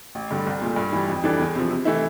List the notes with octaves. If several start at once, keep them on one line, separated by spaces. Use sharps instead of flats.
A1
G2 D3 G3
C2
A#2 A3
G2
E3 G3
F2
E3 G3 D4 A4
E2
C3 F3
C3
E3 A3 E4